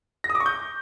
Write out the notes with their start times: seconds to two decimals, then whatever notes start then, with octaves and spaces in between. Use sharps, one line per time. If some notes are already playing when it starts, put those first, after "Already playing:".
0.24 A#6
0.30 D#6
0.35 D6
0.40 C#6
0.46 G6